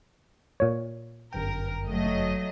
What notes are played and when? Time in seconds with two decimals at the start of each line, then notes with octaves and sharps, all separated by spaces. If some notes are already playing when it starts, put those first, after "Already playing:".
0.60 A#2 C#5
1.33 G1 F#2 A#4 G5
1.88 F#3 A3 D#5